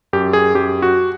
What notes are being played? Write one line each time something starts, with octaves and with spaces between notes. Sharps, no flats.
F#2 G4
G#4
F#2 G4
F#4